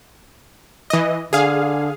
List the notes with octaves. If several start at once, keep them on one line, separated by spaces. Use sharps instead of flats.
E3 D#5
D3 G#4 F5